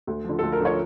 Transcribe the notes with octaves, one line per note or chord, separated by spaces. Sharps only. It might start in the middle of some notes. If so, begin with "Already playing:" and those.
D2
D3 F3
D2 A4
A#4
D3 F3 C#5